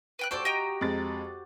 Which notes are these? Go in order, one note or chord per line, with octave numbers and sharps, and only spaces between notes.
B4 G5 F#6
F#4 G4 A4 C5 D5 D7
D#5 G5 A#5
F2 G#3 A6